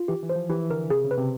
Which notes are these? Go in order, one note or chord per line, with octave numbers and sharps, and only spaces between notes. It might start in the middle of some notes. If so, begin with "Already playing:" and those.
Already playing: F4
E3 G4
E3
C5
F3
E3 G4
D3 A#4
C3 G#4
C#3
B4
C3